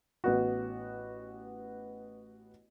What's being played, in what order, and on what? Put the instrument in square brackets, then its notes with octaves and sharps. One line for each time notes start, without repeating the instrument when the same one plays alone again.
[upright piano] A1 B3 F#4